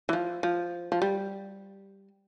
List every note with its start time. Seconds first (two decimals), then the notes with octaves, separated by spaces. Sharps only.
0.09 E3
0.13 F3
0.43 F3
0.92 F3
1.02 G3